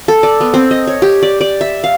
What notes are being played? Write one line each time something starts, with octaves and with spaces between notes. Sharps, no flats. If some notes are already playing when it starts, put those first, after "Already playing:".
A4
D5
B3
C4
D#5
C#5
G4
D5
D5
E5
F5